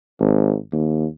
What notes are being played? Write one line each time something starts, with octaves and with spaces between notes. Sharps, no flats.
G#1
D#2